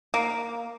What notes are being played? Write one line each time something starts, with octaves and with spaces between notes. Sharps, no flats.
A#3